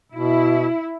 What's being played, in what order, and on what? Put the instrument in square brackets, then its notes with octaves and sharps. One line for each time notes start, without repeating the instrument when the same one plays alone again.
[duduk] B2 [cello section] E4